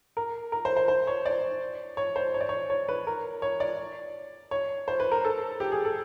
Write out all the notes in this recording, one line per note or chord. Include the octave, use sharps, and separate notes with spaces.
A#4
A#4
C5
C5
C5
C#5
D5
C#5
C5
C#5
D5
C#5
C#5
B4
A#4
C#5
D5
C#5
C5
B4
A#4
A4
G4
G#4
A4